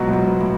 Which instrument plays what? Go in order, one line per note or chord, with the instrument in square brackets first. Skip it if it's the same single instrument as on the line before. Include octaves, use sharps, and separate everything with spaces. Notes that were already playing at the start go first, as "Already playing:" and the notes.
Already playing: [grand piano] C#2 B2 F#3 B3 F#4
[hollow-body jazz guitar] A2
G#2
A2